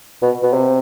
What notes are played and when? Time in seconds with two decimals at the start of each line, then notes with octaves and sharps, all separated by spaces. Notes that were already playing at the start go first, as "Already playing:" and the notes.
0.22 B2
0.43 B2
0.53 C3